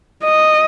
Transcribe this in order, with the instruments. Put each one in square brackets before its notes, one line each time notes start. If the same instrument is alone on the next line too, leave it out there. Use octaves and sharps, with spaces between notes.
[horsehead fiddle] D#5